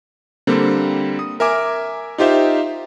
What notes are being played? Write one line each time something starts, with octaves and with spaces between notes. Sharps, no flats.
D3 G3 A#3 C4
D#6
A#4 E5 G#5 D6
D#4 F4 G4 C5 E5 F5